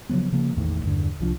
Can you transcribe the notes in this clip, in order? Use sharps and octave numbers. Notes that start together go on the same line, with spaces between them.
C#3 F3 F#3 B3
C#3 F3 A#3
A1 E2 A2 D#3
E2 G2 D3
C2 F3 C#4 D4